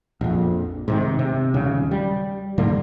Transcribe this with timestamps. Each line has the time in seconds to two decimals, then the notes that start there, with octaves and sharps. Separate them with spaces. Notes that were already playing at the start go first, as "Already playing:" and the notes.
0.21 A#1 F2
0.88 G#2 C3 D#3
1.19 C3
1.54 D#1 C#3
1.91 G3
2.58 G#2 D3 G3 A#3